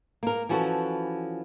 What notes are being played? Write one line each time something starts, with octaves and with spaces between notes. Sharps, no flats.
A#3 A#4
E3 F3 C#4 F#4 A4